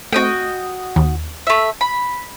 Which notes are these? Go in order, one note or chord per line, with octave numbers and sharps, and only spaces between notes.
A3 C4 F#4 D#5 G5
D#2
A3 E5
B5